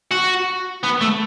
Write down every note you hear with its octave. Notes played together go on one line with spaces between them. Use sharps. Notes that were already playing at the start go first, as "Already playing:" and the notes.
F#4
B3
A3